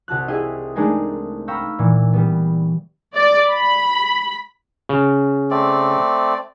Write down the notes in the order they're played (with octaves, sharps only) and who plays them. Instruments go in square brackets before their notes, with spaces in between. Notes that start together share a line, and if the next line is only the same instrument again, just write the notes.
[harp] C2 F#4 A5 F#6
E4 G4 G#4 D#5
G#3 A3 D4 D#4 G#4 A#4
F5 G5 A#5 B5 C#6 E6
A#2 E3
G3 B3
[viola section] D5
B5
[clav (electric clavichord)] C#3
[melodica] A3 C4 D5